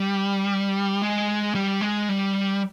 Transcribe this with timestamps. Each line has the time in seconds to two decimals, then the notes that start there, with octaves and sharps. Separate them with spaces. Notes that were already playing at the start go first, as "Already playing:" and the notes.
Already playing: G3
1.02 G#3
1.55 G3
1.81 G#3
2.09 G3